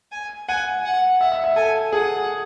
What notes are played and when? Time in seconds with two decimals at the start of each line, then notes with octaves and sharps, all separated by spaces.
0.12 G#5
0.48 F#5 G#5
0.85 F#5
1.21 E5 F#5
1.32 E5
1.44 E5
1.56 A4 G#5
1.92 G#4 F#5